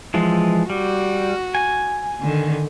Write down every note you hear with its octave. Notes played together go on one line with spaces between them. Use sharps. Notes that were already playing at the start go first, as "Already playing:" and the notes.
E3 F3 G#3
G3 F#4
G#5
D3 D#3